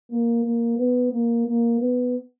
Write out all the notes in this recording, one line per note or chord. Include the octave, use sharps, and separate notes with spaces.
A#3
A#3
B3
A#3
A#3
B3